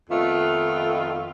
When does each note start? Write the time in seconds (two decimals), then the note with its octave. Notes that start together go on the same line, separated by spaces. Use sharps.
0.10 F2 D#3 A3 B3 F4